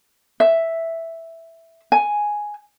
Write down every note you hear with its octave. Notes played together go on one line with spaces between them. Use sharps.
E5
G#5